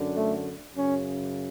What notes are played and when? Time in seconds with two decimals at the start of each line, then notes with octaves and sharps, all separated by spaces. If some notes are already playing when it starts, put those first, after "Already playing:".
Already playing: F#2 D3
0.14 A3
0.76 F#2 C#3 C#4